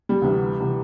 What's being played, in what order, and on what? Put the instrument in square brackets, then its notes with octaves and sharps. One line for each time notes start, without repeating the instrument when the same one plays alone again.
[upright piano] G3
[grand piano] D2 C3 E3 B3
C3 E3 B3